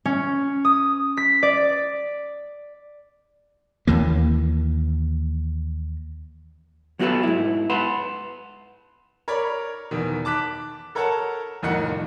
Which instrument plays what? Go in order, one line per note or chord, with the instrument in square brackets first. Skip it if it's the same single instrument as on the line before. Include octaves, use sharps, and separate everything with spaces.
[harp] C#4
D#6
B6
D5
[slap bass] D#2 E3 A#3
[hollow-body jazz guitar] F#3 B3 F#4 G4 A4 B4
G#2 E4
B4 F#5 A5 B5 C6
[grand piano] A#4 C#5 D5 B5
E2 B2 D#3
A5 D6 F#6 B6
A4 A#4 C#5 F#5 A5
C2 F2 A2 D#3 D#4 F#5